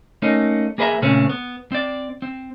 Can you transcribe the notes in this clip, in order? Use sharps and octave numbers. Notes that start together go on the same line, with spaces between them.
A3 A#3 C#4 D#4
A#3 G#4 B4 D#5 E5 A#5
A#2 C#3 A3 C4 C#4
B3
C4 D5
C4